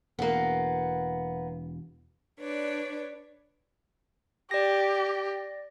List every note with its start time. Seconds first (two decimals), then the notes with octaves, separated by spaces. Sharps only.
0.19 E1 A#3 B3
2.40 D4 B4 C#5 D5
4.51 G4 D5 A#6